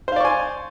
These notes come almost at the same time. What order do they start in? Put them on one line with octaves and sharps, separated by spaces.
C5 F5 D5 C#6 G#5